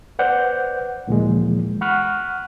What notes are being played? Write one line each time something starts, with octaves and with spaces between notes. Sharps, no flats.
B4 C5 D5 F#5 G6
D2 A#2 E3 F3 G#3
F#5 B5 C#6 F6 F#6